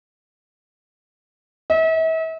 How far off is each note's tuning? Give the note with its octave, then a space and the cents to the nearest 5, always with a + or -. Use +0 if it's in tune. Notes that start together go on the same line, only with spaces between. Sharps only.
E5 -40